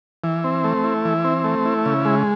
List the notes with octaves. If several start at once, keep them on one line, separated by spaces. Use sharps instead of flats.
E3
C4
A3
E4
E3
C4
A3
E4
C#3
G#3